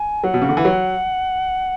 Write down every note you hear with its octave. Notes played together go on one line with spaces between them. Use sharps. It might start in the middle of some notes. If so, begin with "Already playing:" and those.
Already playing: G#5
F#3 F#5
B2
C#3
D3
E3
F#3